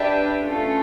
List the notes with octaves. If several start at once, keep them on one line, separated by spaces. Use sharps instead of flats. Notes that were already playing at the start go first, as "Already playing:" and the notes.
Already playing: D4 G4 B4 E5
A3 C#4 F4 A4